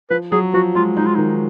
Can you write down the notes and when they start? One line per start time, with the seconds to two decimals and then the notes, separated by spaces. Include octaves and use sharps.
0.10 F3 B4
0.32 F#3 G#4
0.54 F3 F#4
0.75 G#3 F4
0.97 G#3 D#4
1.06 F4
1.15 D#3 D#4